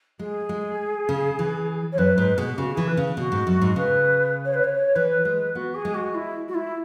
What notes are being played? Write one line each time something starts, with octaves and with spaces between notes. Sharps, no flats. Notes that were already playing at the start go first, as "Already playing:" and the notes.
G#3 G#4
G#3
C#3
E3
C#5
F#2 B4
G#2 B4
B2 G#4
G#4
C#3 F#4
E3 G#4
B4
C#3
B2 F#4
G#2
F#2
G#2
C#3 B4
C#5
B4
C#5
E3 B4
G#3
B3 F#4
G#4
G#3
F#4
E4
F#4
E4